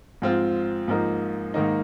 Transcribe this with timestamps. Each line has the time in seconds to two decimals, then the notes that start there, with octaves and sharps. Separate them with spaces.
0.22 G#2 F3 C4 F4
0.88 G#2 F3 A#3 D#4
1.54 G#2 D#3 A#3 D#4